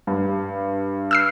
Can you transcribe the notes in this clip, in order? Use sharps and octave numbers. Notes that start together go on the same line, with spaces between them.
G2
E6 F6 C7